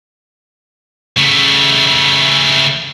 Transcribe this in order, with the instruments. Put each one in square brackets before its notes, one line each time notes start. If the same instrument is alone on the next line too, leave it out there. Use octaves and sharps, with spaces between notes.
[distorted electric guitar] C#3 A3